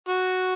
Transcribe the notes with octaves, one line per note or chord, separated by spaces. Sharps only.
F#4